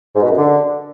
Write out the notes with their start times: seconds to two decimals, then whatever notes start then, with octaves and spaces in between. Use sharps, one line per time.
0.15 G#2
0.22 B2
0.30 F#2
0.37 D3